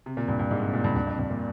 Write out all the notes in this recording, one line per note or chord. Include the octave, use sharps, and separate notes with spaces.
C3
A#2
G2
G2
G#2
C3
A#2
G2
G2
F2
G2
A#2